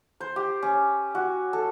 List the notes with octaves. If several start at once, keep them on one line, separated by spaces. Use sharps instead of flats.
C5
G4
C#4
F#4
A4